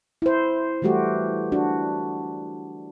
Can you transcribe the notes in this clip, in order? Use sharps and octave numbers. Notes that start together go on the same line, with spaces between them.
E4 C5
E3 G3 A3 F#4 G4
D4 F#4